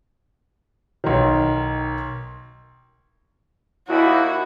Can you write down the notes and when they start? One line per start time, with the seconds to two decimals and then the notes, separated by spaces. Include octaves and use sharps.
1.04 B1 D#3
3.88 D#2 E4 F#4